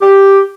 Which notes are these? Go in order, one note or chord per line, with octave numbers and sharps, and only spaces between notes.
G4